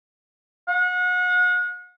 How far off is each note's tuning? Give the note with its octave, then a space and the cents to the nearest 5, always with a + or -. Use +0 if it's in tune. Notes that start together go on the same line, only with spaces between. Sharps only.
F#5 -35